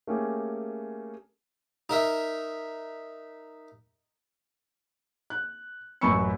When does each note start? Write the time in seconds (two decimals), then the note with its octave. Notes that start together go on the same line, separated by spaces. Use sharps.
0.07 A3 A#3 C#4 G4 G#4
1.89 D#4 A#4 E5
5.30 F#6
6.01 A1 F#2 B5 C#6 E6 C#7